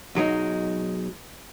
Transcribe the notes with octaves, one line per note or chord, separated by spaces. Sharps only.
B1 F#3 G#3 D#4